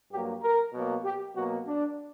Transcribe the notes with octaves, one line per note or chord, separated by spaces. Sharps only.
G2 F#3 A#3 G4
A#4
B2 F#3 A#3
G4
B2 F#3 A#3 F#4
D4